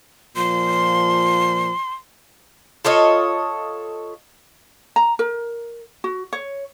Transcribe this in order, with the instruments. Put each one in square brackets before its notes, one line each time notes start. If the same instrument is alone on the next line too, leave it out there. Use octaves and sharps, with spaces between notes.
[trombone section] A#2 F3 [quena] C6
[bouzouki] F4 A4 C#5 D#5
[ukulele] A#5
A#4
F#4
C#5